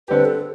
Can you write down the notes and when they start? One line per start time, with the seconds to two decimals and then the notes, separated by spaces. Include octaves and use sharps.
0.08 D3 G3 C4 G4 B4
0.25 A4